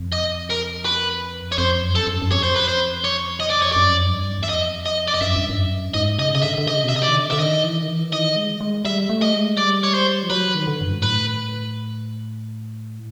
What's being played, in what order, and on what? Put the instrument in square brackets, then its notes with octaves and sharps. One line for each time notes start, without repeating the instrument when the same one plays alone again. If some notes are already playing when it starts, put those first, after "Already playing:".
Already playing: [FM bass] F2
[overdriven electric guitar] D#5
A#4
B4
C#5
[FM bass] F2 [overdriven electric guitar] C5
[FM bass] F#2
[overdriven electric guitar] A4
[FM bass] F#2
F#2
[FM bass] F2 [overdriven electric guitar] C#5
[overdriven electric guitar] C5
B4
C5
C#5
D#5
D5
C#5
[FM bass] F#2 [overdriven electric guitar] D5
[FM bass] F2
F#2
G2
E2
[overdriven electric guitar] E5
[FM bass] F2 [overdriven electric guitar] D#5
[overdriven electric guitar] D#5
D5
D#5
[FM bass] F#2 [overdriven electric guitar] E5
[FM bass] G2
F#2
[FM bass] G#2 [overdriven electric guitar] D#5
[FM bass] C#3 [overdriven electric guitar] D#5
[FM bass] C#3 [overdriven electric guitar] D#5
[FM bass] D3 [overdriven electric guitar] E5
[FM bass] D3
[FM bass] C#3 [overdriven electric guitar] D#5
[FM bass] B2
[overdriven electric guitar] E5
[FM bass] C3
[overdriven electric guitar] D#5
D5
[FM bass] D#3
D3
[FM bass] D3 [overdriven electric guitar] E5
[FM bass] D#3 [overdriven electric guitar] D#5
[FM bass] E3
D#3
E3
[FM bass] D#3 [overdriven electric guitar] D#5
[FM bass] G#3
G#3
[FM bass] G3 [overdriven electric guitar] E5
[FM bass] A3
[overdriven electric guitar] D#5
[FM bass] G#3
[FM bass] G3 [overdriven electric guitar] D5
[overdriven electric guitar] C#5
C5
[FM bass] F3
[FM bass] F#3 [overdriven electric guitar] B4
[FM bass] D#3
D3
F#2
G2
G#2
[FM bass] A2 [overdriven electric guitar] B4